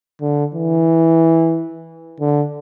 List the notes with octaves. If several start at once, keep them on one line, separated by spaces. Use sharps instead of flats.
D3
E3
D3